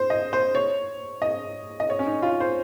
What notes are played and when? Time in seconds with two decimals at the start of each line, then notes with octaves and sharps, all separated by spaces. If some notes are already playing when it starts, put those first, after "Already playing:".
Already playing: C5
0.10 D#5
0.33 C5
0.55 C#5
1.22 D#5
1.80 D#5
1.90 C#5
1.99 C#4
2.06 D#4
2.22 F4
2.40 C5